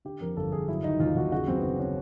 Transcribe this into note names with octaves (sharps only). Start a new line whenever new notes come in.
D3 G4
F2 A#4
G1 A4
G1 G#4
F#3 E4
D#3 D#4
D#2 F4
D#2 F#4
C#3 F#4
F#2 C4
B3
F#1 C4
C#4